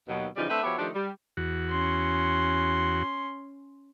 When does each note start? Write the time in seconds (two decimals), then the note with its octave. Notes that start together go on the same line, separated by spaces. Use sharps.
0.08 D#2 B2 F#3
0.36 C#3 E3 F3 G3 D#4 F4
0.50 A3 C4 D4 B4 E5
0.63 F3 B3 F#4 G4 C#5 E5
0.79 D#3 F3 A3 D4 G4 D#5
0.94 G3
1.37 E2 F#4
1.70 C#4 C6